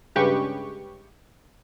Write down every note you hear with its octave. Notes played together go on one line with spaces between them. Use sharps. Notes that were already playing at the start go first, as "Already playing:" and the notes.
G2 C#3 G#3 G4 B4 C#6